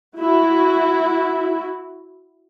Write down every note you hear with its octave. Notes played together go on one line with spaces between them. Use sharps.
E4 F#4